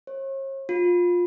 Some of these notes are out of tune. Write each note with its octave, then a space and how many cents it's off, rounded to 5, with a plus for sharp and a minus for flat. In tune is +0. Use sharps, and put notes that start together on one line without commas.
C#5 -45
F4 +15